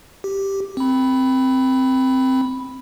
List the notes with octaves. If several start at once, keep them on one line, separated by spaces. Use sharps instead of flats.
G4
C4 B5